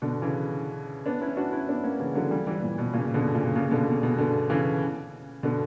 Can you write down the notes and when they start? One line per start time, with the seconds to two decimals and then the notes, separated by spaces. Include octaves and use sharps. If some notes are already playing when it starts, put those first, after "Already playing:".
0.02 B2 D3
0.22 C#3 E3
1.06 B3 D4
1.21 C#4 E4
1.37 D4 F#4
1.53 C#4 E4
1.69 B3 D4
1.84 A#3 C#4
1.99 C#3 E3
2.15 D3 F#3
2.31 E3 G3
2.47 E3 G3
2.62 A#2
2.78 B2
2.93 A#2 C#3
3.14 B2 D3
3.35 A#2 C#3
3.56 A#2 C#3
3.71 B2 D3
3.87 B2
4.03 B2
4.18 B2 D3
4.50 C#3 E3
5.43 B2 D3